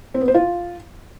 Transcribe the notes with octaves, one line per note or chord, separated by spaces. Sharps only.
C4
B3
C5
F4